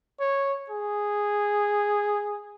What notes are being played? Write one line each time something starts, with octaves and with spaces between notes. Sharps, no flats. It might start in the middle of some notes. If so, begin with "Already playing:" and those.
C#5
G#4